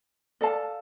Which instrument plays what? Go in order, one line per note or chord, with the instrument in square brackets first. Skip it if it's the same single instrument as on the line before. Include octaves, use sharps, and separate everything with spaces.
[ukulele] A4 D5 F5 A5